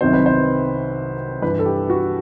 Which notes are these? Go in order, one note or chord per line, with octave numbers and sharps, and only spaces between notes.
C2 C3 D#3 F#3 C5
B4
C5
G2 E3 B4
A4
G4
F#4